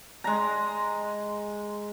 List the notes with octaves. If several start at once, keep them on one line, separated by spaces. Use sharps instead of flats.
G#3 A#5